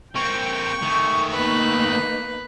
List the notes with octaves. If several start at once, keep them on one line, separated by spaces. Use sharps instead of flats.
A#3 C4 G5 C#6
D#3 A3
A#3 B3 D#4 B4